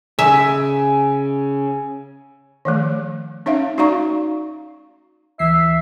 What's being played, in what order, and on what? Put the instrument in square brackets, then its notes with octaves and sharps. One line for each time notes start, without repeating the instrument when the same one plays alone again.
[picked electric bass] C#3 [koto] E5 [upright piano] G#5 E6
[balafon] D#3 F3 A3
C#4 D#4 C#5 E5 F5
D#4 F#4 D5 F5 A#5 C#6
[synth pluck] D2 E3 C7 [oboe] E5